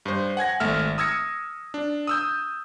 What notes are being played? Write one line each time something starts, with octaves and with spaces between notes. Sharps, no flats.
G2 C5
F#5 G#5 G#6 A#6
G#1 A3 E5 F6
D#6 E6 G#6 A#6 C#7
D4
D#6 E6 G6